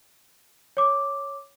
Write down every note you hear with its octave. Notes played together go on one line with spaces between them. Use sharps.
C#5 D6